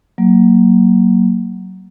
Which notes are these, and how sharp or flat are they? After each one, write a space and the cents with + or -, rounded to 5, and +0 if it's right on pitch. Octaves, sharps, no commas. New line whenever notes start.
F#3 +15 A#3 +0